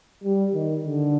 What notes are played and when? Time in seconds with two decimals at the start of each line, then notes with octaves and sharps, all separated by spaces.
0.24 G3
0.54 D#3
0.85 D3